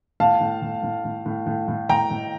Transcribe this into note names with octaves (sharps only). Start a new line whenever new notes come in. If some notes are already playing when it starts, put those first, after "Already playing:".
A2 F5 A5
A2
A2
A2
A2
A2
A2
A2
A2 G5 A#5
A2